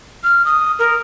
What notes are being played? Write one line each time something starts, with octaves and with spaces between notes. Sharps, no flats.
F6
D#6
A#4